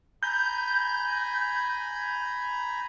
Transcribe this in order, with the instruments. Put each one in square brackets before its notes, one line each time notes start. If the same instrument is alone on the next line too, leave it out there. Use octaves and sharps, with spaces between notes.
[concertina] G#5 A#5 B5 [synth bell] G6